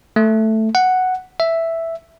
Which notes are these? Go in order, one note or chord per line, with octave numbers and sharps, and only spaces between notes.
A3
F#5
E5